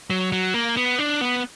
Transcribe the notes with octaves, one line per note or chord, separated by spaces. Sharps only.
F#3
F#3
A#3
B3
D4
B3